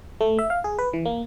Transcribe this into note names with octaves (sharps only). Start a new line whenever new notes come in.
A3
E5
F5
G#4
B4
E3
A#3